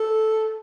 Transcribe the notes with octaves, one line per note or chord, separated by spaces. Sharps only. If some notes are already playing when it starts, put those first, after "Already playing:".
Already playing: A4